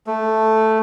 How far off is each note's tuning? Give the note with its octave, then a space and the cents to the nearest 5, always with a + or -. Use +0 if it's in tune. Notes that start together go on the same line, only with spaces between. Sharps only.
A3 +0